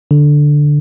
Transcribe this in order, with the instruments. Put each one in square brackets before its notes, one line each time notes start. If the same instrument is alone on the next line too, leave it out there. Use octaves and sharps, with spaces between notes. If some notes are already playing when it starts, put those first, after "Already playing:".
[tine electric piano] D3